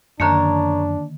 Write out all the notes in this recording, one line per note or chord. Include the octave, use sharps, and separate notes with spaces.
F#2 D3 D#3 A#3 D4 A#4 C#5 A5